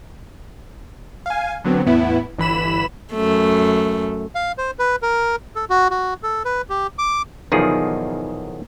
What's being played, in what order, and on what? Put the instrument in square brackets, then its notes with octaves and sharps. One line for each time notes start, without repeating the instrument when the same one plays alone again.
[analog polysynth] F5 G#5
D3 F#3 B3 C4
E2 A2 B3 E4
G1 E3 B5 E7
[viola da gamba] F#2 A3
[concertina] F5
C5
B4
A#4
A4
F#4
F#4
A4
B4
G4
D6
[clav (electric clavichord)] B1 E2 D#3 F3 G#4